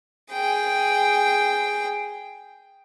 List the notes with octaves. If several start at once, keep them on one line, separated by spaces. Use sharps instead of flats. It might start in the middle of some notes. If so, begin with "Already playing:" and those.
G#4 G5